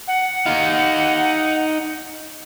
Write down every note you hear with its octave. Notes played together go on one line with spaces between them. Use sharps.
F#5
D#4 F5